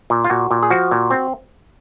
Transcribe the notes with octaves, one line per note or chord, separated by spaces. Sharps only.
A#2
F4
A#2 F#4
A#2
G#4
F3 F#4
A#2
C4